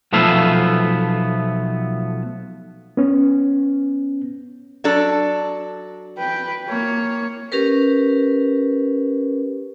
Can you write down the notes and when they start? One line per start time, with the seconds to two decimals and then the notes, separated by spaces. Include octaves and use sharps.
0.13 B1 F3 A3 B3 E5 F5
2.97 B3 C#4
4.84 F#3 D4 A4
6.18 B4 G5
6.68 A#3 C#5
7.52 C#4 G4 A#4 B4